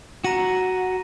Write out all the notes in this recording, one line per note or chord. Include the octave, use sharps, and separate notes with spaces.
F#4 A#5 A#6 D#7